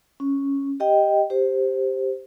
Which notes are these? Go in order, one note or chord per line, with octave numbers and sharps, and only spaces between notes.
C#4
G4 D#5 G5
G4 C5